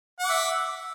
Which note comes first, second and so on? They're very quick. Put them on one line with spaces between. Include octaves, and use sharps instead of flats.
F#5 D6 E5